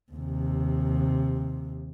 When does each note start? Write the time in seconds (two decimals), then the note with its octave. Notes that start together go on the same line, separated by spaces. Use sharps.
0.12 D#2 C3